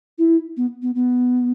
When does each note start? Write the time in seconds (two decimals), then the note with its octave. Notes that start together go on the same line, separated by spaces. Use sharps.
0.18 E4
0.57 B3
0.82 B3
0.95 B3